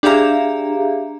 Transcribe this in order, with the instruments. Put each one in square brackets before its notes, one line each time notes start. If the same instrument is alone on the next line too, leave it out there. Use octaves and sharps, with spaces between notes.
[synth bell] D4 G4 G#4 E5 F5 A#5